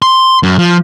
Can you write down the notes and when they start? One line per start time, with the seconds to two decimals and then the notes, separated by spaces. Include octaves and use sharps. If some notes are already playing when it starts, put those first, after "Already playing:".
0.02 C6
0.43 F#2
0.59 F3